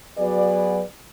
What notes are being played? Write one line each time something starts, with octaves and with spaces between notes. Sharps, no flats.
F#3 B3 F#4 G#4 B4 D5